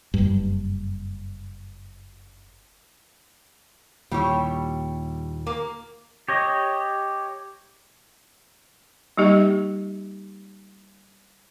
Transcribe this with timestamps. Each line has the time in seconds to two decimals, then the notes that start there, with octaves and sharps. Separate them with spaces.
0.14 F#1 G2
4.11 D#2 A#2 G3 E4 C#5
5.47 A#3
6.29 G4 C#5 D#5
9.18 G3 A#3 D#4 G4 D#5